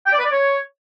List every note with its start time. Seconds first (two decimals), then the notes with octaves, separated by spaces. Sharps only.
0.07 G5
0.13 D5
0.19 B4
0.25 D5
0.31 C#5